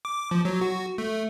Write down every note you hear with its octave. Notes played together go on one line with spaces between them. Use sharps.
D6
F3
F#3
F#4
A3